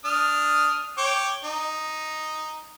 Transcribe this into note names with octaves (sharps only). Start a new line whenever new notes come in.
D4 D#6 F6
C#5 G5 D6
D#4